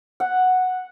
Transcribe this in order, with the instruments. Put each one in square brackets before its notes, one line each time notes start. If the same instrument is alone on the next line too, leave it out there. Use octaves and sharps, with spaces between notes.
[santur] F#5